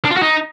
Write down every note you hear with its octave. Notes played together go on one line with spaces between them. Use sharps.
D4
F4
F#4
D#4